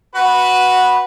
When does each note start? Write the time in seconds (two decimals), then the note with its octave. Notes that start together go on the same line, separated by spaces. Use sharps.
0.15 F#4 B4